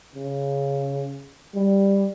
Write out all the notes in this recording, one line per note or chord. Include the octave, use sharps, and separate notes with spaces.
C#3
G3